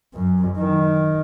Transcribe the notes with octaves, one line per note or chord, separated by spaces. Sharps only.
F#2
D#3